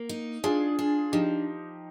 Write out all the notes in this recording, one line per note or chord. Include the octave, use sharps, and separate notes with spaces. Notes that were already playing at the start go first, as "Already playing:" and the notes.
Already playing: A#3
D#4
D4 F4 G#4
D4
F3 D#4 G4